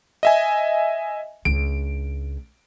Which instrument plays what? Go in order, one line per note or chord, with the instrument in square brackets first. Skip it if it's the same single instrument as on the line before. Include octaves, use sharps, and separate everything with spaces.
[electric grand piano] D#5 E5 G#5
[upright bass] C#2 D4 [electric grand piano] D7